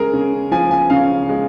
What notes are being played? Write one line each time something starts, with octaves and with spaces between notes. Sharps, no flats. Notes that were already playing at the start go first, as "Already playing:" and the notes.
Already playing: C#3 G#3 G#4 A#4
C#3
F3 G#5
G#5
C#3 F5
G#3